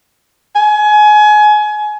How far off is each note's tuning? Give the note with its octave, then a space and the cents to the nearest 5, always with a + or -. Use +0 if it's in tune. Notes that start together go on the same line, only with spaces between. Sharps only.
G#5 +25